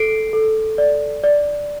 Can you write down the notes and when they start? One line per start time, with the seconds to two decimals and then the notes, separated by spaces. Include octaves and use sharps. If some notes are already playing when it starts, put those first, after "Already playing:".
Already playing: A4 C7 D7
0.33 A4
0.78 D5
1.24 D5